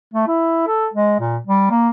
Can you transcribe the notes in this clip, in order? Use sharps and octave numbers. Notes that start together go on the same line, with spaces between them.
A3
E4
A4
G#3
A#2
G3
A#3